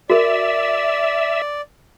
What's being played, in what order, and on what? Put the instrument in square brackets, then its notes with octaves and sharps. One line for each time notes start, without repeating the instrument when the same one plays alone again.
[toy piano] F#4 A#4 [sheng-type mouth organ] D5 [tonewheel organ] E5